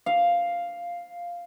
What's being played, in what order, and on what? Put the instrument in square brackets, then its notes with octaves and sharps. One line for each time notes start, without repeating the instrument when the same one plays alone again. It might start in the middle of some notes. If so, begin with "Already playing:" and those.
[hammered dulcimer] F5